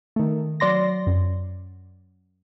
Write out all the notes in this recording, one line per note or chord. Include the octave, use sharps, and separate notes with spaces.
D#3 A3
F#3 D5 C6 A#6
F#2